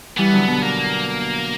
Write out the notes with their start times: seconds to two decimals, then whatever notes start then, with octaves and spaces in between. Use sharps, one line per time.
0.17 E3 G3 B3
0.32 D3 F#3
0.47 B2 D3
0.63 A#3